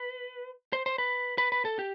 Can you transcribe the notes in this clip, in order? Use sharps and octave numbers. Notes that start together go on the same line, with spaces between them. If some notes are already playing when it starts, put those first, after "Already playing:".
Already playing: B4
C5
C5
B4
B4
B4
A4
G4